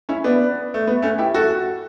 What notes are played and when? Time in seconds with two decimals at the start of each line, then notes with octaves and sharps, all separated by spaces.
0.09 C#4 E4
0.24 B3 D4
0.74 A3
0.87 B3
1.02 A3 C#4
1.18 E4 G4
1.34 F#4 A4